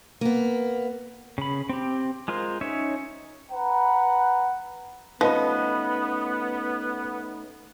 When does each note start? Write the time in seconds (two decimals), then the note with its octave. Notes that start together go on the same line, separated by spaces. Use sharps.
0.21 A#3 B3
1.38 C#3 B5
1.69 C4 G4
2.28 G#3 F4 A#4 C5
2.61 C#4 D#4 C#5 E5
3.51 B4 F#5 A#5
5.21 F3 A3 B3 C#4 D#4 B4 D#5 B5